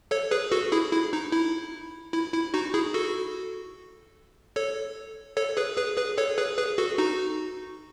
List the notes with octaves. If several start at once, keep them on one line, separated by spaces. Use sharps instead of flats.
A4 C#5
G#4 B4
F#4 A4
E4 G#4
E4
D#4
E4
E4
E4
D#4 F#4
E4 G#4
F#4 A4
A4 C#5
A4 C#5
G#4 B4
G#4 B4
G#4 B4
A4 C#5
G#4 B4
G#4 B4
F#4 A4
D#4 F#4